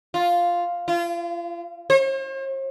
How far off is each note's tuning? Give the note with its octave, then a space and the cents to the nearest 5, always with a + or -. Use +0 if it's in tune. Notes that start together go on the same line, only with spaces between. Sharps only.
F4 +0
F4 -35
C5 +45